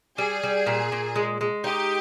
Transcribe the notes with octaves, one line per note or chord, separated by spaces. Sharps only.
G3 G#4
G3
A#2
A#2
G#3
G#3
D#4 G4